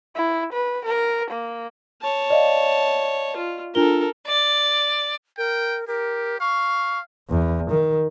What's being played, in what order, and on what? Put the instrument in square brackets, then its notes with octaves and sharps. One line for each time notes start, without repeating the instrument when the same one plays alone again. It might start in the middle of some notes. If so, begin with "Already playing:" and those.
[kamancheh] E4
B4
A#4
A#3
[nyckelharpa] C#5 A5
[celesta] D5 D#5 F5
[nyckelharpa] F4
[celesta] D4 F4 G7 [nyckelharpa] A4 A#4
[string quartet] D5
[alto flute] A#4 [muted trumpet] G5
[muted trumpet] G4 [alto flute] A#4
[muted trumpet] F5 [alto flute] C#6
[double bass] E2
D#3